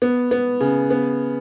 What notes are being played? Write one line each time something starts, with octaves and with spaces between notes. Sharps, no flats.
B3
B3
C#3
B3